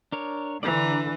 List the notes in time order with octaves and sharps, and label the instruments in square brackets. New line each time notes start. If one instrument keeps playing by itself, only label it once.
[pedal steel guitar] D4 A#4 C#5
[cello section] D3 [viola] E3 [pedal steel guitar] D5 A#5